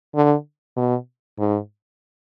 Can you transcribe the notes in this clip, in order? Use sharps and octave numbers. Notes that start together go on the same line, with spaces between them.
D3
B2
G#2